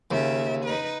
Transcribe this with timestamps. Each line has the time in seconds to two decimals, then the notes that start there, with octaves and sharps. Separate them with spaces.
0.11 D#2 C#3 E5
0.65 D#4 B4